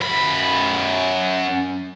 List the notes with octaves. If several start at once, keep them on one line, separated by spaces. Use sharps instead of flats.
F#2 B5